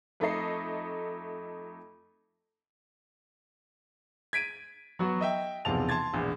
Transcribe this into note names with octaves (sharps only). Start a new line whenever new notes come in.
F2 A3 D#4 A4 D#5 C7
G#6 B6 D7 D#7
F#3 B3 F#4
D#5 E5 G5
B1 E2 C3 F3 A5 F7
A5 C6 G#6 A6
E1 A#1 E2